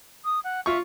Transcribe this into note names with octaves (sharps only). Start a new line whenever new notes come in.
D#6
F#5
F4 E5 C#6